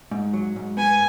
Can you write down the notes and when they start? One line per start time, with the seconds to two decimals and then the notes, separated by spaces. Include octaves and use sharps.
0.11 G#2
0.34 F#3
0.56 G#2
0.77 B3 G#5